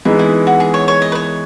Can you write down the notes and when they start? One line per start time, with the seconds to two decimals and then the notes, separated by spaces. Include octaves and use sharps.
0.05 E3 G#3 B3 D#4 E4
0.19 E4
0.47 F#4
0.60 G#4
0.74 C#5
0.88 C#5
1.02 D#5
1.12 B4
1.15 C#5